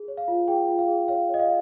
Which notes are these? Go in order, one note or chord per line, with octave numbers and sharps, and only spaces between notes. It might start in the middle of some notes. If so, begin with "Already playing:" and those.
Already playing: G#4
C#5
F5
F4
G#4 G5
F4
F5
G#4
C#5 F5
C#5 D#5
F5